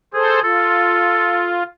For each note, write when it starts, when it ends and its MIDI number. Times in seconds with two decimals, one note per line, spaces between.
0.14 0.42 68
0.14 0.40 69
0.14 0.40 72
0.44 1.63 65
0.44 1.64 69